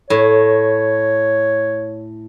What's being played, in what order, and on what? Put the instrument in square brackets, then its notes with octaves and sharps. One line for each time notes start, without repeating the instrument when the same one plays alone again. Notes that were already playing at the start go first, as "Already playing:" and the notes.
[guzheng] A2 [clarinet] C#5